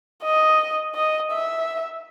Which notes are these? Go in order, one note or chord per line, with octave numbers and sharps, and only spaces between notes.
D#5
D#5
E5